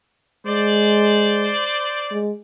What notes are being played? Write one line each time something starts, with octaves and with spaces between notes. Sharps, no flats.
G#3 C5 D5
G#3